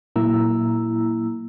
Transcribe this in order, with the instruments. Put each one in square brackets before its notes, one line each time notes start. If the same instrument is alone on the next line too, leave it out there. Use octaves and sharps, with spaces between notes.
[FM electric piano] A#2 F#3 A#3 E4 A#5 E6